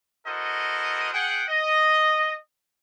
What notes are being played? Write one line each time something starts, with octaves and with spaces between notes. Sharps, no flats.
E4 F#4 A4 A#4 C5 D#5
G#4 F#5 G5
D#5